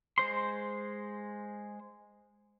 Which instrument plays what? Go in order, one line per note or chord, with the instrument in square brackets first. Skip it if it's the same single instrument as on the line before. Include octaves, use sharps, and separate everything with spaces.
[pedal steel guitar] G#3 C5 C6